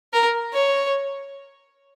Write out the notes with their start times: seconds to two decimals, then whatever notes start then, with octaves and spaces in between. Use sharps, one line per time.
0.13 A#4
0.53 C#5